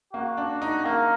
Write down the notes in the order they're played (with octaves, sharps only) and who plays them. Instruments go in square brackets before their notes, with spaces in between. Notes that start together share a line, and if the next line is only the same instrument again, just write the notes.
[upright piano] A#3 [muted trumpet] F#4
[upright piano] D4
D#4
[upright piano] A#3 [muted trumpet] A#4